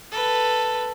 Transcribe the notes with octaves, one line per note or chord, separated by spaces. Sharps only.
A4 B4